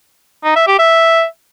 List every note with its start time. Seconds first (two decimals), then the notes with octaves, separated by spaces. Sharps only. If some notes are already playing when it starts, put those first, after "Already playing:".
0.44 D#4
0.56 E5
0.67 G4
0.79 E5